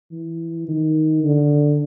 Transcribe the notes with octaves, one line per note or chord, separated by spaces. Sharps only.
E3
D#3
D3